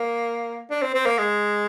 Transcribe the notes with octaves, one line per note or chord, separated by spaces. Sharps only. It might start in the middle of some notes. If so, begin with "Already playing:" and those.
Already playing: A#3
D4
C4
C4
A#3
G#3